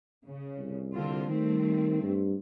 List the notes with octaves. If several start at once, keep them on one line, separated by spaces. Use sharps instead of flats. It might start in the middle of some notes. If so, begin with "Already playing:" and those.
C#3
C2
D3 C4 F4
D#3 G3 A3 C4
G2